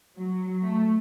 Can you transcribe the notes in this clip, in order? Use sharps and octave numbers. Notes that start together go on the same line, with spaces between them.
F#3
A3